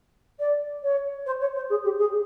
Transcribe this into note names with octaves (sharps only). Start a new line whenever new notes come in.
D5
C#5
C5
C#5
C5
G#4
G4
G#4